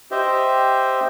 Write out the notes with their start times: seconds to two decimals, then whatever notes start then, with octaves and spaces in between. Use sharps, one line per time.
0.11 G4 C5 D#5 E5